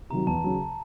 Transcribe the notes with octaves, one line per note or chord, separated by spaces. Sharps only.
C3 D#3 F#3 A#5
E2 A5
C#3 F#3